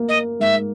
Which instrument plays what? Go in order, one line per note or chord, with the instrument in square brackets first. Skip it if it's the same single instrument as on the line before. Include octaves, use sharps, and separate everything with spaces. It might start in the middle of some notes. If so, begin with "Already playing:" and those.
Already playing: [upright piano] A#3
[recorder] D#5
[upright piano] G#2 [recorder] E5